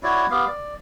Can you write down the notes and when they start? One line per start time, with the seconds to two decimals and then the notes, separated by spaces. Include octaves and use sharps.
0.03 E4 F#4 C#5 D5
0.30 B3 G4 F5
0.47 D5